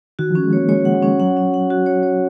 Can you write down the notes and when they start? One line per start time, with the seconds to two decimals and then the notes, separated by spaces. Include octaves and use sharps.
0.19 D#3 F#4
0.31 F3 C#4
0.43 G#3
0.53 A#3 C#5
0.69 G#3 C#5
0.85 F#5
0.94 G#3
1.02 C#4
1.20 F#3 F#5
1.37 C#4
1.54 F#5
1.70 F#4
1.86 C#5
2.03 C#5